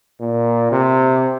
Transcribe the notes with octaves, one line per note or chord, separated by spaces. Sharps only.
A#2
C3